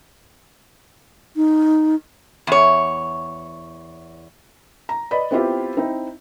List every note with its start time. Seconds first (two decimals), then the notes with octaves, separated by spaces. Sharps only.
1.36 D#4
2.47 E2 C#5
4.89 A#5
5.11 B4 D5 D#5 B5
5.31 B3 C4 E4 F4 G4
5.77 C4 D#4 E4